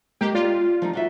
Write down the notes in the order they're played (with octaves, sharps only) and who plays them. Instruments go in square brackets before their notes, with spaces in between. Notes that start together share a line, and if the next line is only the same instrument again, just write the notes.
[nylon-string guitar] G#3 A#3 [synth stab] G4
[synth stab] F4 [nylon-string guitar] D5
[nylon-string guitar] F3 G3 D#4
F4 F#4 E5